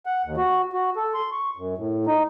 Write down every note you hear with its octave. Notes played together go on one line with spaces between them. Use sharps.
F#5
D#2
F#4
F#4
A4
C6
C#6
F#2
A2
D#4